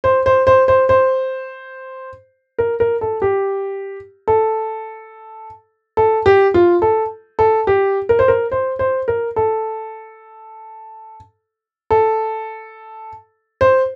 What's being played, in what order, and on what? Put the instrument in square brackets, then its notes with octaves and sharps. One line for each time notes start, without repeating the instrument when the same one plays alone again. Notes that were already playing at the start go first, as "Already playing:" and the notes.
[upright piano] C5
C5
C5
C5
C5
A#4
A#4
A4
G4
A4
A4
G4
F4
A4
A4
G4
A#4
C5
A#4
C5
C5
A#4
A4
A4
C5